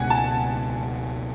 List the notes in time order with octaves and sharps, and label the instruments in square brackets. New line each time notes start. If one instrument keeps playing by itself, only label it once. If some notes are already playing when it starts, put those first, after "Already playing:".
Already playing: [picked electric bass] C#2 B2 G#3 [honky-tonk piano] F#5 G#5
[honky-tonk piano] A5